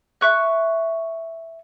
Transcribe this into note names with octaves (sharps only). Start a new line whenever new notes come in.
E5 C#6 F#6